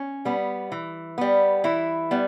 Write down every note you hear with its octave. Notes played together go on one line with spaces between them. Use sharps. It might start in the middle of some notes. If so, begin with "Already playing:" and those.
Already playing: C#4
G3 B3
E3
G3 B3
E3 E4
G3 B3